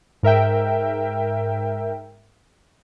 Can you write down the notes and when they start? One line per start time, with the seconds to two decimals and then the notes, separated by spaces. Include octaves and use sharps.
0.23 G#2 A#4 E5 G5